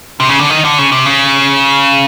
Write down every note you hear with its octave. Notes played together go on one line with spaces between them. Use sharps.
C3
C#3
D3
D#3
D3
C#3
C3
C#3